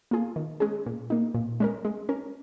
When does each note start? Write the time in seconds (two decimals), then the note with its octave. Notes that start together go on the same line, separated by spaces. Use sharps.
0.11 A#3 F4 G#4
0.36 D#3
0.60 G#3 C#4 G#4
0.86 A#2
1.10 A#3 D#4
1.34 A#2
1.60 G#3 C#4 A#4
1.85 G#3
2.09 C#4 A#4